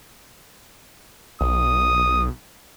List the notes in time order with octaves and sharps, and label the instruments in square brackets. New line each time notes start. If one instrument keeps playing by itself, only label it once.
[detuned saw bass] B1 [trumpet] D#6